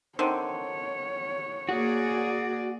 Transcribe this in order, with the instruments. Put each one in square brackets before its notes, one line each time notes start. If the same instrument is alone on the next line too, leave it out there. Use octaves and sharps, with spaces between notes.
[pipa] D3 D#3 C4 [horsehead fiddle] C#5
[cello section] A#3 G#4 D5 [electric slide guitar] F#4